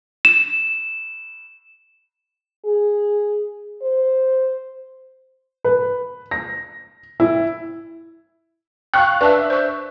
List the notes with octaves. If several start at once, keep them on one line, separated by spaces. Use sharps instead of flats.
E7
G#4
C5
B4
A#6
E4
F5 G5 C#6 F#6
D4 B4 E5 A5
C5 C#6